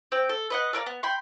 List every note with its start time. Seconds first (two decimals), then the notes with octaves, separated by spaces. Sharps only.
0.12 C4 G5
0.29 A4
0.50 B4 D#5 F#5
0.73 A4 A#4 D5 F5
0.86 B3
1.03 G5 B5 C6